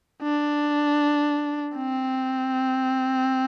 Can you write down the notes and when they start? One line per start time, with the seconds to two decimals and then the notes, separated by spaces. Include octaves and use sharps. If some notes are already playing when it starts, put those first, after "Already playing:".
0.23 D4
1.76 C4